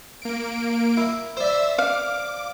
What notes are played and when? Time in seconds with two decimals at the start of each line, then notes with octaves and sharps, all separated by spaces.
0.22 A#3 D7
0.97 E4
1.37 C5 D5 E5 E6
1.78 F5 D6